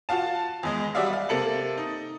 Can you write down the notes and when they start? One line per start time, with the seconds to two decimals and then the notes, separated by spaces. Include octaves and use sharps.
0.09 F4 F#4 F5 A5
0.63 E2 G#3 D#5
0.95 F#3 G3 F#4 D5 E5 F5
1.13 F5
1.29 C3 A#3 A4 C#7 F#7
1.78 D#4